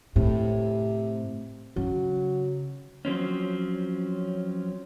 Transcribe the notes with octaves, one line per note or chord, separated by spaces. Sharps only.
A2 C3
C#3 F#3
F3 F#3 C4 C#4